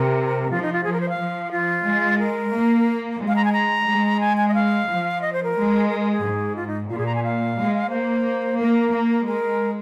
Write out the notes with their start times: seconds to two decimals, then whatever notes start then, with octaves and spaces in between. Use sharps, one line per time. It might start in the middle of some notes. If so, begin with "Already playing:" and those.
Already playing: C3 A#4
0.50 F3 F4
0.62 D#4
0.73 F4
0.84 F3 G#4
0.93 A#4
1.01 C5
1.09 F5
1.17 F3
1.51 F4
1.84 G#3
2.19 A#4
2.52 A#3
3.20 G#3
3.28 F5
3.36 A#5
3.45 G#5
3.53 A#5
3.87 G#3
4.20 G#5
4.37 G#5
4.48 D#5
4.54 F5
4.87 F3
5.22 D#5
5.33 C5
5.43 A#4
5.56 G#3
5.89 A#4
6.00 A#4
6.12 G#4
6.23 G#2
6.56 F4
6.67 D#4
6.90 A#2 F4
6.98 G#4
7.06 A#5
7.15 G#5
7.24 F5
7.57 G#3
7.90 A#3 C5
8.58 A#3 A#4
8.92 A#3
9.25 G#3 A#4